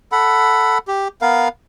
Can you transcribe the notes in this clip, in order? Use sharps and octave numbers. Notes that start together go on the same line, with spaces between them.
A4 F#5 B5
G4
B3 A#4 F5